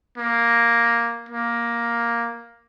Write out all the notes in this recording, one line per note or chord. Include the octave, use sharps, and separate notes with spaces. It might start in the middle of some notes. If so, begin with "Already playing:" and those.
A#3
A#3